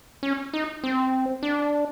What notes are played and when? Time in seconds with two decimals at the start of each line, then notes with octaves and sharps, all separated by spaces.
0.23 C#4
0.53 D#4
0.83 C4
1.43 D4